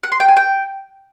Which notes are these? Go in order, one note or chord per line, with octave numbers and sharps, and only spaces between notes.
F#5
C6
G5
G#5
G5